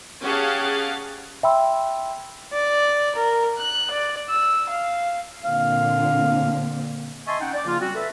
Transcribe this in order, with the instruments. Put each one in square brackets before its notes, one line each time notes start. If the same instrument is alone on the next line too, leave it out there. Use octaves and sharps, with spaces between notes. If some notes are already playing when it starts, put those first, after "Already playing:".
[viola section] C#4 G4 G#4 F5 F#5 A5
[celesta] E5 G5 B5 C6 E6
[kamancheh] D5
A#4
F#6
D5
E6
F5
[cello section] A#2 D3 C4 [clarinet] F5
[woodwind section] D#5 E5 G#5 A5 C6 C#6
C#4 D#4 F#5 G5
D5
C#3 F3 A#3 F4
G3 C4 C#4 F#4
A4 B4 E5